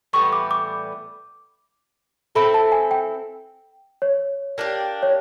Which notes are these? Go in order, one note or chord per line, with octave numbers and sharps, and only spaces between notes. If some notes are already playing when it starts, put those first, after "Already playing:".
A2 E3 G3 B3 C#6
D6
D6
C4 E4 A4 B5
A5
G#5
G5
C#5
A#3 D4 G4
C#5